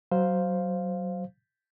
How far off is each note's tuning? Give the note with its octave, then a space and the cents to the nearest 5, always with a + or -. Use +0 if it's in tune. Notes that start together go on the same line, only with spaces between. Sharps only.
F#3 +20 C5 +0 F5 +0